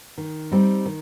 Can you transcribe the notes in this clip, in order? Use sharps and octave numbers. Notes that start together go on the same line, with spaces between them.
D#3
G3 C4 D#4
D#3